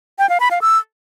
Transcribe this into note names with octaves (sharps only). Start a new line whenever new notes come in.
G5
F5
B5
F5
E6